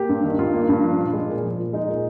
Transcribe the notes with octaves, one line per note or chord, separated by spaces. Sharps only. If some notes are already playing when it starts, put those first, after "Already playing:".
Already playing: A#3 G4
G2
D#3
G2 F4
A#3
G2
F3
A#2
G#3
A#2
F3
A#2
G#3 D#4
A#2